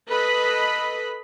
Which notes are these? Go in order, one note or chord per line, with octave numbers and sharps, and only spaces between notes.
A4 B4 D#5 B5